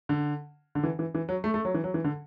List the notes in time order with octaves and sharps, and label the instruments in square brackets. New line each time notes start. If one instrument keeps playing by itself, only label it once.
[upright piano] D3
D3
E3
E3
E3
F#3
A3
A3
F#3
E3
F#3
E3
D3